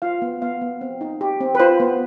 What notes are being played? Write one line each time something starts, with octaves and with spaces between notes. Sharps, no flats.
F4 F5
B3
B3 F5
B3
C4
D#4
G4
C4
B4
F4 C5
B3